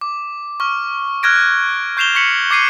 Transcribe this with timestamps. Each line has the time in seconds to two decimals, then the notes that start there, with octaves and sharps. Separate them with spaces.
0.01 D6
0.60 C#6 F6
1.23 F6 F#6 G#6 A#6 D7
1.97 C#6 G6 C7 E7 F7 G7
2.15 C#6 B6 C#7 F#7
2.51 D6 G#6 C7 D#7 G7